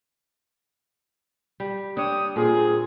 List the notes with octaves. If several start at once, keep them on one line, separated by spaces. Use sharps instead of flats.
G3
D4 C#5 G5 D#6
A#2 C4 G#4